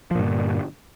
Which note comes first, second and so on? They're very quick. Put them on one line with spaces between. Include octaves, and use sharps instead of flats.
F3 A#2 G2 D3